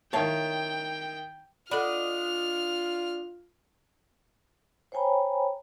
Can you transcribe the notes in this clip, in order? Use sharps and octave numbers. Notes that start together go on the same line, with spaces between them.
D#3 E4 C#5 F5 G5 A5
D4 F4 A4 D#5 F#5 B5 F6
C5 C#5 G5 G#5 A#5 B5